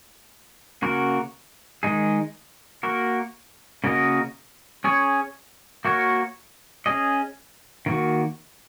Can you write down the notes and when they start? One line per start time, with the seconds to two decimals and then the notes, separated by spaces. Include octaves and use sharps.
0.82 C#3 A#3 F#4 A#4
1.83 D#3 G#3 D#4 G#4
2.83 A#3 F#4 A#4
3.84 C#3 A#3 F#4 A#4 D#5
4.84 C#4 G#4 C#5
5.85 A#3 F#4 A#4 C#5
6.86 C#4 G#4 D#5
7.86 D#3 A#3 F#4